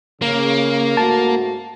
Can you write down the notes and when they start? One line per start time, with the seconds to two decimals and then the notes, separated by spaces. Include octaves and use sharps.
0.22 C#3 A#3
0.97 G#2 A3 F#4 A5